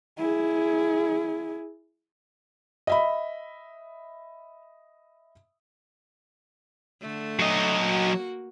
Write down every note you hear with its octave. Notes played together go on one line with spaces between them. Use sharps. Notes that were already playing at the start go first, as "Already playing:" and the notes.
E4 G#4
D#5 E5 B5
D3 A3
F#3 D#5
A#3 F#4